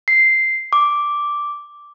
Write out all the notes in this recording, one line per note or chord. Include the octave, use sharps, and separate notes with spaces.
C7
D6